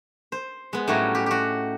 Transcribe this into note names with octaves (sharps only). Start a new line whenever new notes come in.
C5
G#3 B3
A2 F#3 G3 C#4 D#4 F#4
G4
F#4 G4